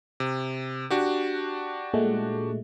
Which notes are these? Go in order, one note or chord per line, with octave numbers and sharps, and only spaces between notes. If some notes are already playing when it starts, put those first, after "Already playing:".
C3
D4 F#4 G4
A#2 G#3 A3